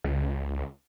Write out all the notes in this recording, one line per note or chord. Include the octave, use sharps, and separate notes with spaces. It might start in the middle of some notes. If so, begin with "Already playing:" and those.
C#2